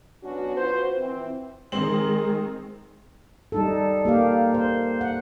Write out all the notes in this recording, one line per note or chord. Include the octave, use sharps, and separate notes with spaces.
F#3 B3 C#4 D4 F#4
F4 F#4 B4 C5
E3 C4
D#3 G#3 C4 F#7
G3 D#4 A4
A#3 G4 F5
C5
F#5